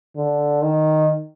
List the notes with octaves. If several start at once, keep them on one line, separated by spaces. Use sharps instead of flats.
D3
D#3